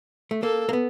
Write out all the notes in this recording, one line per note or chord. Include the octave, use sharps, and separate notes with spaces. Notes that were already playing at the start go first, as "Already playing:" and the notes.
A3
A#3 A4
A#3
B3